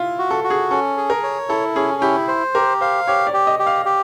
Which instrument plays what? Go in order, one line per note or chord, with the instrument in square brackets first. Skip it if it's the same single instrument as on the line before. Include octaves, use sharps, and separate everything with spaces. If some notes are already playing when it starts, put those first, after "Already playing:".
Already playing: [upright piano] E4 F4
[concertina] F#4
[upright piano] A4
[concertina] F#4
[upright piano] G#4
[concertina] C#4 [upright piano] A4
[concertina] G#4
[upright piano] A#4
[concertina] C#5
[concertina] E4 [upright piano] A4
[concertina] C#4 [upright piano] G#4
[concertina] E4 [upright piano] G4
[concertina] C5
[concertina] G4 [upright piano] A#4
[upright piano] C5 [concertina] F5
[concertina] G4 [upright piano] C#5
[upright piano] D5
[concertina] G4
[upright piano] D#5
[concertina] G4
[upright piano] F5
[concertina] G4